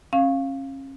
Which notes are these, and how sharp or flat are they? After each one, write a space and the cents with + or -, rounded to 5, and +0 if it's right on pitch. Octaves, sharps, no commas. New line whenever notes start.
C#4 -35 F5 +0